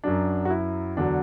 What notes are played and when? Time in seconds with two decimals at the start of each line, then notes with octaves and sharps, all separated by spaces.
0.04 F#2 F#3 D4
0.45 F#4
0.50 E4
0.97 E2 D3 F#3 D4